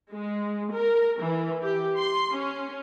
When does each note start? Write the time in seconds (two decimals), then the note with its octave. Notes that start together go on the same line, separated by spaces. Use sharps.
0.14 G#3
0.73 A#4
1.21 E3
1.63 G4
1.99 C6
2.35 C#4